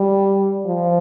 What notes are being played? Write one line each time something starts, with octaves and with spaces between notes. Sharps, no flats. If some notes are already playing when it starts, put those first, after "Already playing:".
Already playing: G3
F3